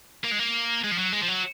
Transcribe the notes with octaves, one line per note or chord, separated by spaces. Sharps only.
A#3
G#3
A#3
G#3
F3
F#3
G#3
F3
F#3